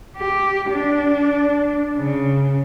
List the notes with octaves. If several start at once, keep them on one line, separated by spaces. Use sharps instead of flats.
G4
D4
C#3